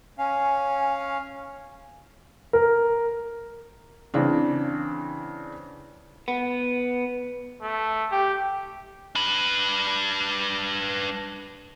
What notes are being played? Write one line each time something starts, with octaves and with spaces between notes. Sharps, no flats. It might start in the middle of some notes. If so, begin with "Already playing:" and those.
C#4 F5 G#5
A#4
C#3 E3 C4 D4
B3
A3
G4
D4 B4